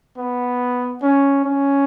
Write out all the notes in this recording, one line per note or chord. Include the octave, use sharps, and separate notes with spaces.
B3
C#4
C#4